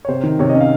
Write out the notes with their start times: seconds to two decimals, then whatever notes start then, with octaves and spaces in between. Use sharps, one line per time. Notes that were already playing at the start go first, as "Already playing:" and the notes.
0.05 C#5
0.08 C3 C5
0.23 D#3
0.39 C3 C#5
0.49 D#5
0.55 C#4
0.61 F5